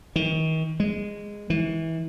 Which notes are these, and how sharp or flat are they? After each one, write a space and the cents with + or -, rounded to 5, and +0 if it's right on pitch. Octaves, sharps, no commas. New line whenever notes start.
D#3 +40
G#3 -10
E3 -25